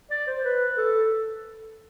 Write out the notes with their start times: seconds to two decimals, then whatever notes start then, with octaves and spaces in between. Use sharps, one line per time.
0.10 D5
0.27 C5
0.44 B4
0.78 A4